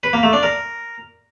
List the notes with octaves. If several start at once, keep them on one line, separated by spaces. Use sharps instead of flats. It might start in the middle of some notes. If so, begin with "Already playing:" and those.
B4
A#3
A3
D4
A#4